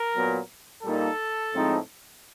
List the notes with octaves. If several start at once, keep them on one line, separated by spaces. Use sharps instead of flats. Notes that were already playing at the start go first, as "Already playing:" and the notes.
Already playing: A#4
A#2 F#3 B3
A#2 G3 A#3 D#4 A4
A2 F3 G#3 C4 D#4